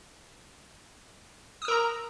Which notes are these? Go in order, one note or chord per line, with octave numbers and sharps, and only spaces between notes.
A#4 A#5 D#6 E6